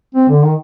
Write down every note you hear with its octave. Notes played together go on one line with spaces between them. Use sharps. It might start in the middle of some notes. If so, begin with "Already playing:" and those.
C4
D3
D#3